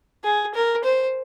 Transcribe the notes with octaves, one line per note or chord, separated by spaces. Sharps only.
G#4
A#4
C5